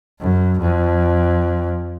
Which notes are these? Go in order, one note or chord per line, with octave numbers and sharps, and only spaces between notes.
F#2
F2